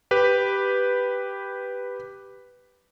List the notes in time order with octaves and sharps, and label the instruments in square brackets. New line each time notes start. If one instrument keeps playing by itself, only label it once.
[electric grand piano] G4 B4